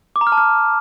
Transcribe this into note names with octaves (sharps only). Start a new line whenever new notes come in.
D6
A#5
F6
A5
F6